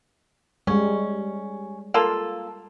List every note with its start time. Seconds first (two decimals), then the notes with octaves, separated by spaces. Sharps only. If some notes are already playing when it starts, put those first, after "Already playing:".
0.67 G3 G#3 C#4
1.94 A#3 F4 A4